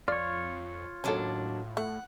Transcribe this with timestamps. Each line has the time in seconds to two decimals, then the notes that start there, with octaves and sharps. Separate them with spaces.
0.08 F2 F4 C#5 D5
1.04 D#2 A2 F#3 C#4 D4 A4
1.77 A3 F#5